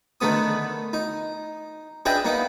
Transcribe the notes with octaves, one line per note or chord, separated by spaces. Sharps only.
D3 D#3 A3 B3 D#6
D#4
D4 G#4 B4 D#5 E5 G5
A#3 B3 D#4